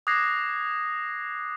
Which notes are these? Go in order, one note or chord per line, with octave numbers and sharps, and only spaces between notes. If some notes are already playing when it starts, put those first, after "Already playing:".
D6 D#6 F#6 G#6 A#6 C7